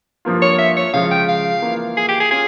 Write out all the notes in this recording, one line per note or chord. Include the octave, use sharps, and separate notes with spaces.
G2 F3 A#3 F4
C#5
E5
C#5
C#3 F3 G#3 F5
G5
F5
E3 A#3 F4
G#4
G4
G#4
C#4 F4 G#4